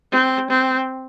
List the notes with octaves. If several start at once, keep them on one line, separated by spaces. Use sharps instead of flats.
C4
C4